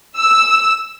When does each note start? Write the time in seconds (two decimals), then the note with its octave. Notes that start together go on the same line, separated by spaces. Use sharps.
0.18 E6